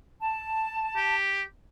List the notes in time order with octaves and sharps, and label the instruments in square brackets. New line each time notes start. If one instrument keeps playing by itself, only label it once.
[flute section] A5
[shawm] G4